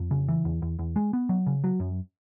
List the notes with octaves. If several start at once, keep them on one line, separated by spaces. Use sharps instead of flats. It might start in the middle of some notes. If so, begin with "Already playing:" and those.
Already playing: F2
C#3
E3
E2
E2
E2
G#3
B3
F#3
C#3
F#3
F#2